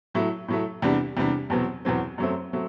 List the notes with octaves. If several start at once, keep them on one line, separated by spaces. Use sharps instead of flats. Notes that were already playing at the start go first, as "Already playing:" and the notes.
A2 F#3 A3
A2 F#3 A3
E2 C3 G3 D4
E2 C3 G3 D4
E2 B2 F#3 C4
E2 B2 F#3 C4
F#2 F#3 A3 C4
F#3 A3 C4